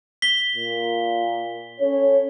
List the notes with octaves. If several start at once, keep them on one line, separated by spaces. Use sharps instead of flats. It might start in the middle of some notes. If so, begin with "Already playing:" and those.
B6 G7
A#2
C#4 A4 C#5